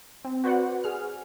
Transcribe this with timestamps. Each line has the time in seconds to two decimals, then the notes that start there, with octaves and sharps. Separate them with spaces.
0.25 C4
0.44 F#4 B4 C5 D5 F#5
0.84 G#4 F6